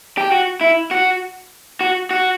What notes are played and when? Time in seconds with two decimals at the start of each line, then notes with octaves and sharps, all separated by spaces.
0.18 G4
0.32 F#4
0.61 E4
0.91 F#4
1.81 F#4
2.11 F#4